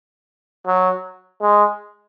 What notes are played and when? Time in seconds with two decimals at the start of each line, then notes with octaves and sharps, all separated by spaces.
0.67 F#3
1.41 G#3